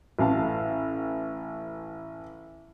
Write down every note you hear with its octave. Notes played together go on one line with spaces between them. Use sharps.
A1 F5 A5